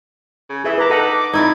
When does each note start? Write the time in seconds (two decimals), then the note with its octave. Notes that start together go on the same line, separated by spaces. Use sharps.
0.50 C#3
0.64 E3 G#4 E5
0.78 B4 A#5 D6
0.90 D#4 A4 F#5
1.33 F2 D#4 E4 D5 G#6